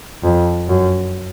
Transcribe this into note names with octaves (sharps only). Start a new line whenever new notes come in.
F2
F#2